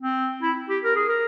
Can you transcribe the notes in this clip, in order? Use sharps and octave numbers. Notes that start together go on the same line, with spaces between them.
C4
E4
G4
A#4
G#4
A#4